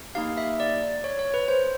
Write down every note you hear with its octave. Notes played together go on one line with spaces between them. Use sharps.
A#3 D#4 G4 F5
E5
D5
C#5
C#5
B4
C5